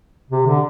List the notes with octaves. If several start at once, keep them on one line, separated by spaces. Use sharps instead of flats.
C3
D3